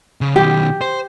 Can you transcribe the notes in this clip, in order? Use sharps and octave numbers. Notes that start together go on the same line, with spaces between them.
C#3
B2 D#3 G4
C5